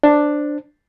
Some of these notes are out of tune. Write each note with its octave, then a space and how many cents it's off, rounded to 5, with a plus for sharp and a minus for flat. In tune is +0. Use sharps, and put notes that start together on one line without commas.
D4 +5 C5 +0